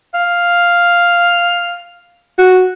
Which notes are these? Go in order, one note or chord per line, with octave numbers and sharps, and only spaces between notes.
F5
F#4